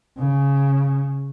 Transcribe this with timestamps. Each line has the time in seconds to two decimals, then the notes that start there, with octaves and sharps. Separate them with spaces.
0.18 C#3